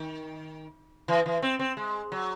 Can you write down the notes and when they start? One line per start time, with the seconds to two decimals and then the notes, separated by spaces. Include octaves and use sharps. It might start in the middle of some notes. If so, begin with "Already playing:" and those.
Already playing: D#3
1.08 E3
1.26 E3
1.42 C4
1.59 C4
1.77 G#3
2.12 F#3